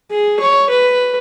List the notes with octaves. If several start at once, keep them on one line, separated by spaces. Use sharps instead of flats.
G#4
C#5
B4